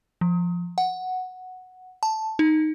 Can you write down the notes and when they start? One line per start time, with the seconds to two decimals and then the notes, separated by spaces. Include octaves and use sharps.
0.21 F3
0.78 F#5
2.03 A5
2.39 D#4